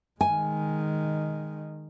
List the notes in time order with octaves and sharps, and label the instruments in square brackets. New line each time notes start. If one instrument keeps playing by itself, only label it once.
[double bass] D#3 G#3 [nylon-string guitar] G#5